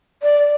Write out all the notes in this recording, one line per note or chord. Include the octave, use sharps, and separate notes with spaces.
D5